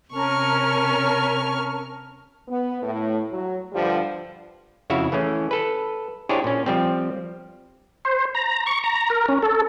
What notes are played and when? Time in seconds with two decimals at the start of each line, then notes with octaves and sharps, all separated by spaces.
0.14 C3 C#4 A#4 A5 C#6 F6
2.48 B3
2.83 A2
3.31 F#3
3.72 G2 D3 F3 G3
4.90 F2 C#3 E4 F#4 E5 F5
5.12 E3 A3 C#4 G#4
5.51 A4 B4
6.29 D4 E4 G4 G#4 C5 C#5
6.44 A#2 C#4
6.66 F3 G3 C4
8.05 C5
8.35 A#5
8.66 C#6
8.84 A#5
9.10 A#4
9.28 C#4
9.43 A4